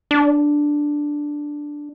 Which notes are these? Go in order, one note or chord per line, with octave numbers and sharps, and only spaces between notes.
D4